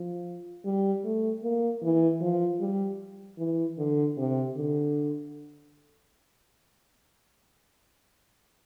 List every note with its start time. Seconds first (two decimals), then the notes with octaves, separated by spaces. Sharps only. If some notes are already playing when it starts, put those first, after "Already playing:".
Already playing: F3
0.65 G3
1.05 A3
1.43 A#3
1.83 E3
2.21 F3
2.61 G3
3.38 E3
3.78 D3
4.17 C3
4.56 D3